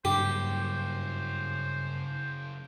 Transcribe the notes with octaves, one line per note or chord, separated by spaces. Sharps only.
G2 C#3 F#3 G4 C5